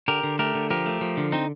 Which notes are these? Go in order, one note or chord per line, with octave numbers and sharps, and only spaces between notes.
D3 G4 A#4
D3
A3 G4 A#4
D3
F3 G4 A#4
A3
F3
D3
C4 D#4